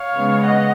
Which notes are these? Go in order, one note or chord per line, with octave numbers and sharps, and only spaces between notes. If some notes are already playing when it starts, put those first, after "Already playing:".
Already playing: C#5 F5
C#3 G#3 B3
D#5 F#5